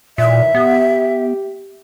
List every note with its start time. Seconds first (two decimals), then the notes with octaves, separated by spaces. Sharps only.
0.18 F#2 A#2 D#3 E3 E5
0.55 B3 G4